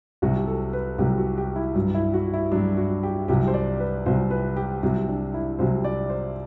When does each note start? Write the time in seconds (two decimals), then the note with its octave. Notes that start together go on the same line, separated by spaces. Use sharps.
0.22 C2 C3 F#3 F#4
0.47 A4
0.73 B4
0.98 C2 C3 F#3 G4
1.18 F#4
1.38 G4
1.56 E4
1.75 G2 F#3
1.94 E4
2.14 F#4
2.34 E4
2.52 G2 F#3 D4
2.77 F#4
3.03 G4
3.28 C2 C3 F#3 G4
3.48 C5
3.54 D5
3.80 B4
4.06 C2 C3 F#3 C5
4.31 B4
4.56 G4
4.83 C2 C3 F#3
5.08 D4
5.34 E4
5.59 C2 C3 F#3 C5
5.84 D5
6.10 C5